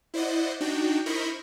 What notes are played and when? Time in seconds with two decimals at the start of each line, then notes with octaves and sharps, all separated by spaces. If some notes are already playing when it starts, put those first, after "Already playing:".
0.14 E4 C5 D5 D#5 F#5
0.61 D4 D#4 F#4 G5
1.06 E4 A#4 C5 D#5 B5 C#6